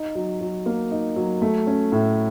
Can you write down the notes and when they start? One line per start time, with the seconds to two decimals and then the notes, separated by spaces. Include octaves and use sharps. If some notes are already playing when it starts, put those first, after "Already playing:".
Already playing: D#4
0.15 F#3
0.41 F#3
0.66 A#3
0.91 D#4
1.16 F#3
1.42 A3
1.67 C#4
1.92 A2